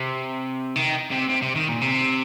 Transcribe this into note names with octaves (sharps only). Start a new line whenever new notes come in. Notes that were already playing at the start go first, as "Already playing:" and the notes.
Already playing: C3
D#3
C3
C3
C3
D#3
A#2
C3